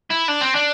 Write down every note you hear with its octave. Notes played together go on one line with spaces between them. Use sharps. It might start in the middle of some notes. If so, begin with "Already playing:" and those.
E4
D4
C4
D4